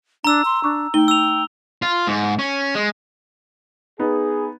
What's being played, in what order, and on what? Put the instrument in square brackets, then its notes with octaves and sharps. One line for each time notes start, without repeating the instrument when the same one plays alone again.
[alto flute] D4 [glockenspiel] A#5 E6
[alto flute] C6
[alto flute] D4 [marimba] C#6 D6 F#6
[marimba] A3 D#4 [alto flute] G5 [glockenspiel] G7
[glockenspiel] E6 F7
[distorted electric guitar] F4
G#2
C#4
G#3
[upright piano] B3 D#4 [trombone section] G#4